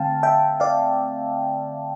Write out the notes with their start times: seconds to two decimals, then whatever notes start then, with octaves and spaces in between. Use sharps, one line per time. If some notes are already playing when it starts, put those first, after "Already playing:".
Already playing: D3 A3 C4 F5 G5 A5
0.23 E5 G5
0.60 D5 F5